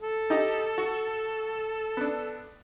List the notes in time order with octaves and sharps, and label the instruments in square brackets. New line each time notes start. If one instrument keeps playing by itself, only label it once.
[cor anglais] A4
[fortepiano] D#4 G4 D#5
F#4
B3 D4